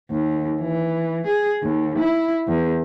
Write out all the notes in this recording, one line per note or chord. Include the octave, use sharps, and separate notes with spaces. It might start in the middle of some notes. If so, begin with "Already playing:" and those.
D#2
E3
G#4
D#2
E4
E2